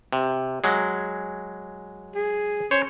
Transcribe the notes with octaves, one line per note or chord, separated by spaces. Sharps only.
C3
F#3 G#3
G#4
C#4 C5 C#5